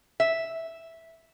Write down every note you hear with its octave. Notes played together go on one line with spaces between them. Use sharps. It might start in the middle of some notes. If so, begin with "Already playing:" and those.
E5